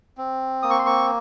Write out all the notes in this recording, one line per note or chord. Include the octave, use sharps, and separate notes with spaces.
C4
A#3 D#6
C#6
C6
C#6